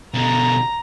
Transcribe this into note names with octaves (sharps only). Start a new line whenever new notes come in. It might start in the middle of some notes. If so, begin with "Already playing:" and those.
B2 D3 A#5